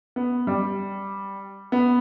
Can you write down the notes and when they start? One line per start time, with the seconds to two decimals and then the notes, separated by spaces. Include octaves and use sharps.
0.16 B3
0.47 G3
1.72 B3